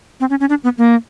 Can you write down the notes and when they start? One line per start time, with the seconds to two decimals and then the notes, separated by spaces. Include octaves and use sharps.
0.20 C4
0.30 C#4
0.40 C#4
0.49 D4
0.64 B3
0.78 A#3